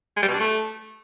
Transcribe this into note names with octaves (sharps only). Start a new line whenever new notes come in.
G#3
G3
B2
D4
A3